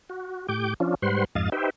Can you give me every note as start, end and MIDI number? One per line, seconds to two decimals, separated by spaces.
0.10 0.47 66
0.49 0.74 45
0.49 0.74 67
0.49 0.74 86
0.49 0.74 91
0.80 0.95 53
0.80 0.95 61
0.80 0.95 62
0.80 0.95 65
1.02 1.25 44
1.02 1.25 55
1.02 1.25 71
1.02 1.25 72
1.02 1.25 78
1.02 1.25 84
1.35 1.50 41
1.35 1.50 44
1.35 1.50 75
1.35 1.50 77
1.35 1.50 93
1.52 1.70 63
1.52 1.70 67
1.52 1.70 71
1.52 1.70 72
1.52 1.70 76
1.52 1.70 79